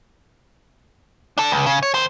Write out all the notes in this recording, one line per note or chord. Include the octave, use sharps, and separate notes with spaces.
D4 A4
C#2
C#3
C#5
D#2 C5